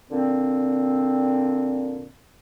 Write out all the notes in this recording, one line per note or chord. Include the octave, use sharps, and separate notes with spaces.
A#2 D3 C4